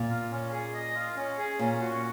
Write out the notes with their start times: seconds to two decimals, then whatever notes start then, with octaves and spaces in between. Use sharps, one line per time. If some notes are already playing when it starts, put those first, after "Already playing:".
Already playing: A#2
0.09 F4
0.31 C#4
0.52 G#4
0.74 D#5
0.94 F4
1.16 C#4
1.38 G#4
1.59 A#2 C#4
1.81 F#4